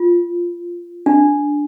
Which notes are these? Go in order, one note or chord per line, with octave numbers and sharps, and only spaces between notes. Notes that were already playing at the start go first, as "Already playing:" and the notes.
Already playing: F4
D4